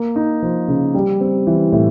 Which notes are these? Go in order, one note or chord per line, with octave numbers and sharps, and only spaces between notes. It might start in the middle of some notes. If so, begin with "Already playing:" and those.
Already playing: A#3
D#4
F3
C#3
G3
C4
E3
A2